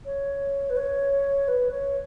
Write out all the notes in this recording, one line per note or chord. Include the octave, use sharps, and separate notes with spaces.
C#5
B4
C#5
B4
C#5